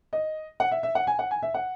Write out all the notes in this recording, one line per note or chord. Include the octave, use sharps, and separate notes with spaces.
D#5
F#5
E5
E5
F#5
G#5
F#5
G#5
E5
F#5